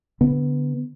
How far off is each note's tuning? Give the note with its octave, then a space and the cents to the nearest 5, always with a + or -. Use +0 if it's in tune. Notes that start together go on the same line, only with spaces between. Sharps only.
D3 -20 B3 +0